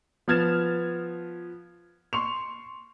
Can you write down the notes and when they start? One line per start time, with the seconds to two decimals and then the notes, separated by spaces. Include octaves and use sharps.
0.28 F3 B3 F6 G#6 A6 E7
2.13 C6 C#6 F7